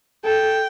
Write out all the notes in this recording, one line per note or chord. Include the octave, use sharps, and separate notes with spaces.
A4 G5